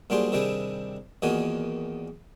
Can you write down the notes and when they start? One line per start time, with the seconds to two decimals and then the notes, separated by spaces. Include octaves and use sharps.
0.10 A#2 F#3 G3 D4 G#4 C5
0.32 C3 D#3 G3 D4 E4 G#4
1.22 E2 A#2 D#3 D#4 F#4 G#5